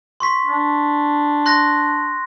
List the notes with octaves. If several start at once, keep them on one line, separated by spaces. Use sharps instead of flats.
C6 C#6 B6
D4
C6 F#6 A#6